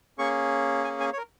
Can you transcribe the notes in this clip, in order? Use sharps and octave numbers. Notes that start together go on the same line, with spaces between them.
A#3 C#4 G#4 C#6
G#5
G#5
C#5
A#4